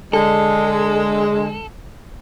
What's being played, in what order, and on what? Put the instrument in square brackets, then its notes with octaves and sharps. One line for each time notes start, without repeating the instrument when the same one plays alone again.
[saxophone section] D3 G#3 [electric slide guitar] A4